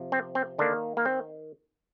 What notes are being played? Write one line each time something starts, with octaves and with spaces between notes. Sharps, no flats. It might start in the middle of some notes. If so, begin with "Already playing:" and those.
Already playing: C3 F3
C4
C4
D3 D#3 A#3 D4
A#3
C4